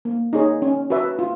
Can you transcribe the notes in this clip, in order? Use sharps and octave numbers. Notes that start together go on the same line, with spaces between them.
A#3
D#4 G#4 C#5
C#4
F#4 B4 E5
F4